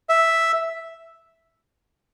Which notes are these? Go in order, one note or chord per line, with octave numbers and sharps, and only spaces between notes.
E5